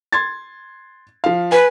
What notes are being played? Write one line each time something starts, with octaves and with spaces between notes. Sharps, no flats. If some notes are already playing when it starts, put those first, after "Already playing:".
C6 G#6 A6
F3 F5
B4 G#5